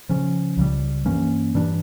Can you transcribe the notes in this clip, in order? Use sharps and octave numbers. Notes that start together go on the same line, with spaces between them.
C#3 F3 C#4
C#2 C#3 G3
G2 E3 A#3 C#4
G2 E3 G3 D4